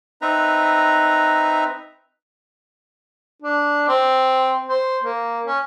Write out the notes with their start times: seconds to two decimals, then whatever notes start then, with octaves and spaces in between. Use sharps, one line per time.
0.22 C4 D#4 B4 E5 A#5
3.42 D4
3.88 C4
4.69 C5
5.03 A#3
5.46 C#4